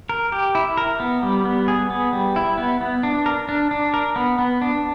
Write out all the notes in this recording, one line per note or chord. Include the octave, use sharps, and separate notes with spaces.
A#4
G4
E4
A#4
B3
G3
B3
G#4
B3
G3
E4
B3
B3
D4
A#4
D4
D4
A#4
B3
B3
D4